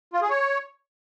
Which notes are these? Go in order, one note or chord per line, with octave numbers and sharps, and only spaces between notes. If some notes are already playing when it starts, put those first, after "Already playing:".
F4
G#4
C#5